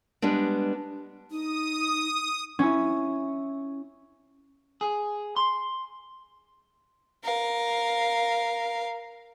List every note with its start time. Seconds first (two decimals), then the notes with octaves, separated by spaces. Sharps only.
0.22 G3 G#3 B3 D4
1.31 D#4 D#6
2.59 C#4 E4
4.81 G#4
5.37 C6
7.23 A#4 F5